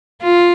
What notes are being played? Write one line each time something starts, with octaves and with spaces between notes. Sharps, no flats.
F4